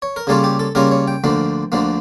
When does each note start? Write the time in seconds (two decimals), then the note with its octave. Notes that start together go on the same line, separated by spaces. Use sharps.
0.02 C#5
0.16 A#4
0.27 C#3 G3 A#3 C#4 F4 A4
0.44 G4
0.59 A4
0.75 C#3 G3 A#3 C#4 F4 A#4
0.91 C#5
1.08 G5
1.24 D2 D3 F3 A#3
1.72 D2 D3 F3 A#3